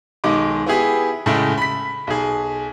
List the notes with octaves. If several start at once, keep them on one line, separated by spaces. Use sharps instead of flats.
B1 D#3 G#3 D6
B3 E4 G4 G#4
A2 C#3 G#3 A3
B5 B6
B1 G#4